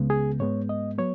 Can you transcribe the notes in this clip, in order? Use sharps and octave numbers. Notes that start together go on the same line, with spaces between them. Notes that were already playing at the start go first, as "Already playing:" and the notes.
Already playing: C#2 C#3 G#3 B3
G#4
G#2 G#3 B3 C#5
D#5
F#3 B3 C#5